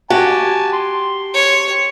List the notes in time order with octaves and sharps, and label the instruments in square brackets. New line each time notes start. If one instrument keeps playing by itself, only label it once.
[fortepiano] F#4 [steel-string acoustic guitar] G4 [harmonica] G#5 A5
[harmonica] C6
[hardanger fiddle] C#5